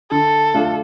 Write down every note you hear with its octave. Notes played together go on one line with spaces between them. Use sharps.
D3 A4
A3 D4 F4